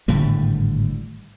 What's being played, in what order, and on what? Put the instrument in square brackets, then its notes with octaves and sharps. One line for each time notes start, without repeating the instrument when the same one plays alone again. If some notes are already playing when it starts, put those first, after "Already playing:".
[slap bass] G#1 A2 D3 G3